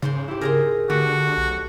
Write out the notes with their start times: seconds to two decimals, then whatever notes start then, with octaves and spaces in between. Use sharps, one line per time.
0.02 G#2 C#3 C5 C6
0.28 E4 G4
0.41 G#4 A#4 A#5 C6
0.90 D3 A3 F#4 G4
1.37 B1